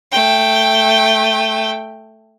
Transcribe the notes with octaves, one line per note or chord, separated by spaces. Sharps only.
A3 G5